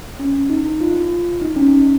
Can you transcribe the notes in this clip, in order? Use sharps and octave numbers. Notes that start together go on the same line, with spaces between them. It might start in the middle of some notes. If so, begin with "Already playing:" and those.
C#4
D#4
F4
D#4
C#4